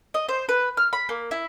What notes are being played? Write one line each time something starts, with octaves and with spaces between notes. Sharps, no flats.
D#5
C5
B4
F6
B5
A#3
E4